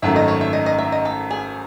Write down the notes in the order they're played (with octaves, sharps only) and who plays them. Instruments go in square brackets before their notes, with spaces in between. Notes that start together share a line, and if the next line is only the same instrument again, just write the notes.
[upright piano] G#1 F#2 D#3 A3 [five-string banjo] E5
[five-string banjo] D#5
C#5
E5
D#5
D#5
E5
D#5
A4
G#4